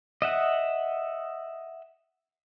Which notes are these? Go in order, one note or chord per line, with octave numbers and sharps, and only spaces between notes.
D#5 E5 F#5